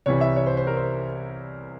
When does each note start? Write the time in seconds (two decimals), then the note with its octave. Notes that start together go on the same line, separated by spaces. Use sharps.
0.06 C2 C3 E3 G3 C#5
0.21 E5
0.36 C#5
0.46 C5
0.57 C5
0.67 A#4
0.77 C5